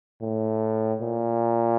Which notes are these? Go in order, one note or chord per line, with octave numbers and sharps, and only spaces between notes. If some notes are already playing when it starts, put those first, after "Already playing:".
A2
A#2